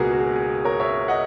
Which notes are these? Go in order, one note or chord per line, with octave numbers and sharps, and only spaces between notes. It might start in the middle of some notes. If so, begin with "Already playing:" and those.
Already playing: C#2 B2 A#3 F#4 G#4 A#4
F#4
G#4
G#4
A#4 C#5
C#5 E5
D#5 F#5